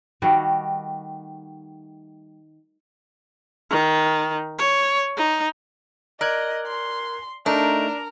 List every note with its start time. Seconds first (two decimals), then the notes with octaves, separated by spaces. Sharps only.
0.22 D#3 G3 A3 F#4
3.70 D#3
4.58 C#5
5.17 D#4
6.21 A#4 D5 D#5 F#6 G#6
6.67 C6
7.46 A3 D4 D#4 A#4